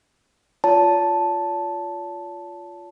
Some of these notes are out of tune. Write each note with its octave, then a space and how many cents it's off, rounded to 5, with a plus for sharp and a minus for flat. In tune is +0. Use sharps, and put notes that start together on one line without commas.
F4 +0 C#5 +45 A5 +0